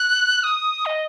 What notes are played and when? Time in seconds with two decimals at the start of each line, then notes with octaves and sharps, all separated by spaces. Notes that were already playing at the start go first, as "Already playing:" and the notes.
Already playing: F#6
0.43 D#6
0.86 D#5